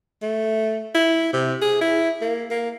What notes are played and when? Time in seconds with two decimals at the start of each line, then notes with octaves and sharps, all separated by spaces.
0.22 A3
0.95 E4
1.33 C3
1.61 G#4
1.81 E4
2.22 A#3
2.51 A#3